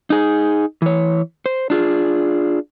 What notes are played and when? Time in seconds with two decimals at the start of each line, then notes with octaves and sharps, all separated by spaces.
0.10 D#4 G#4
0.82 E3 C#5
1.46 C5
1.70 D4 F4 G#4